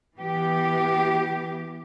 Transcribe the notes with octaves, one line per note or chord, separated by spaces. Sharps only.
E3 B3 G4